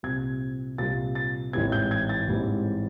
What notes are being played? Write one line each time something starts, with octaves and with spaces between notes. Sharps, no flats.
C2 A#2 G3 C4 G#6
C2 A#2 G3 C4 A6
A6
A1 G#2 E3 G3 C4 G#6
G6
G#6
A6
A1 G#2 E3 G3 C4